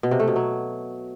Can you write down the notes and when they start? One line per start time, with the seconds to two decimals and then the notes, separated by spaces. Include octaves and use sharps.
0.03 B2
0.11 C3
0.19 A3
0.28 B2
0.36 F#3